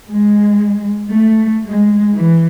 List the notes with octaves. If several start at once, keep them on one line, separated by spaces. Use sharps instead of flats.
G#3
A3
G#3
E3